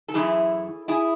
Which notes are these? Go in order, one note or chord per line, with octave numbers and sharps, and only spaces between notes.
A4
F#2 E3 A3 E4 G#4
E4 G#4